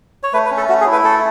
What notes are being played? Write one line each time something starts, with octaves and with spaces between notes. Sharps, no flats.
C#5
A3 B4
B4
C#4
A4
A3 F#4
G#4
E4
B4
A3 A4